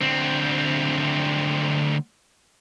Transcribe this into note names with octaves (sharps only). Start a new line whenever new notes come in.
D2 C4